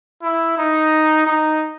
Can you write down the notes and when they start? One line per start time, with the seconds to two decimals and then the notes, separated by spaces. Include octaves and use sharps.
0.23 E4
0.58 D#4
1.27 D#4